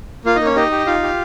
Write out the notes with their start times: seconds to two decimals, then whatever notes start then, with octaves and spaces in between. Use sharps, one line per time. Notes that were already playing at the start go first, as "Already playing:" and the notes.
0.25 A#3 F4 F5
0.35 A#3 D#4 D#5
0.45 C#4 C#5
0.55 D#4 G4 D#5
0.71 G4
0.86 D#4 F4 F5
1.03 G4